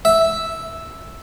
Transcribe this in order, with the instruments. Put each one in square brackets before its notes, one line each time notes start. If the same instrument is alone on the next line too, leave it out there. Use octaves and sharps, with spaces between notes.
[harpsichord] E5